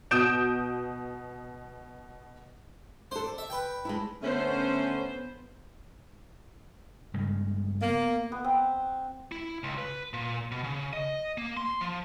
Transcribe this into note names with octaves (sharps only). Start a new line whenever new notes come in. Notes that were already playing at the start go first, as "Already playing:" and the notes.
B2 D#6 G6 D7 E7
D4 A4 C5
D5
E5
B4 G5
G#3 D4 E4
D3 A3 B3 C#4 C5
G2 C#3 G#3
A#3 B3
B3
C4
E4
C#2
B4
A#2
B2
C#3
D#5
A#3
C6
F3